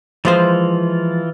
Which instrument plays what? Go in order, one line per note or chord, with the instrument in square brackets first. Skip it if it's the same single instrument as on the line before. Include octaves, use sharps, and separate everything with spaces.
[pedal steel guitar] E3 F4 [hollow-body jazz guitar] F3 G#3 C5